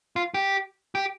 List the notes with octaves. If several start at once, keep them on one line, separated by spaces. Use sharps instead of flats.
F4
G4
G4